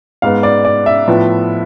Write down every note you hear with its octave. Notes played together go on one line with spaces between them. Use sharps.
G#2 G#3 B3 F5
D5
D5
E5
A2 F3 B3